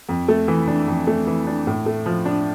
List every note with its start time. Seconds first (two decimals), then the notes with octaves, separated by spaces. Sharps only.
0.09 F2
0.28 A3
0.48 E3
0.68 D4
0.88 F2
1.07 A3
1.27 E3
1.47 D4
1.67 A2
1.86 A3
2.06 F3
2.26 D4